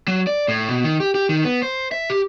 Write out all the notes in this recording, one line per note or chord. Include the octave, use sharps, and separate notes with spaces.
F#3
D5
A2
B2
D#3
G4
G4
D#3
B3
C5
E5
G4